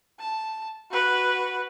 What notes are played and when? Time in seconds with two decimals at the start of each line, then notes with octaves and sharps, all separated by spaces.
0.19 A5
0.91 F#4 B4